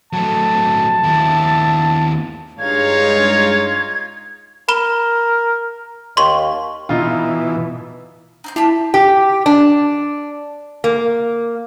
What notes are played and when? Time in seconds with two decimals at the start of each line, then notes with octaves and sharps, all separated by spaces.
0.13 F#3 A3 A5
1.03 D#2 E4
2.59 G2 G#3 D#4 F4 C#5 F5 G#6
4.69 A#4 B5 E7 G7
6.17 D#2 C6 C#6
6.89 B2 E3 D#4 F4
8.44 D#4 C6 G6
8.56 E4 G4 A5 B5
8.94 G4
9.46 D4
10.84 A#3